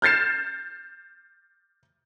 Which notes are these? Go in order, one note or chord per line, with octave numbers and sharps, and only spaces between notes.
F6 G6 A6 C7 E7